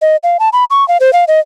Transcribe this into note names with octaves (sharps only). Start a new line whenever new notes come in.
D#5
F5
A5
B5
C#6
F5
C5
F5
D#5